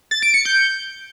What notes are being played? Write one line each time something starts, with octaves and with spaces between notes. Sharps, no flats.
A6
D7
C#7
G6